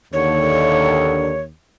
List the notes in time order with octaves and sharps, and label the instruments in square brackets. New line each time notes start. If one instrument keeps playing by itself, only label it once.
[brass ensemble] D#2 [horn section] D3 [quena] C#5